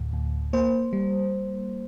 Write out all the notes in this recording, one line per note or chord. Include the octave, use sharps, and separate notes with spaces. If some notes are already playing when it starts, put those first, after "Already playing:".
Already playing: D2 A2
D2
A#3 C5
G3